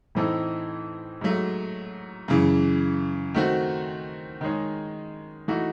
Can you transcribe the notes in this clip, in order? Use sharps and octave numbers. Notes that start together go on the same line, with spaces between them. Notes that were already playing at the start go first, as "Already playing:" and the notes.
A2 E3 C4 D#4 A4
G#2 F#3 A3
F#2 C#3 E3
D#3 A3 C4 F#4
D#3 G#3 D#4 G#4 C#5
E3 A3 D#4 F#4